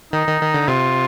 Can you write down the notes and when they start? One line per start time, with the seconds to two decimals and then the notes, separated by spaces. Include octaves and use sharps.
0.13 D#3 D#4
0.27 D#3
0.41 D#3
0.54 D3
0.68 C3 F4